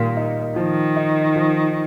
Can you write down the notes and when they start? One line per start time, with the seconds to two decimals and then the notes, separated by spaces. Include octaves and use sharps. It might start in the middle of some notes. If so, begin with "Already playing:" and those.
Already playing: A#2 D#3 G3 A#3
0.17 D#4
0.56 D#3 F3
0.96 D#4
1.36 F3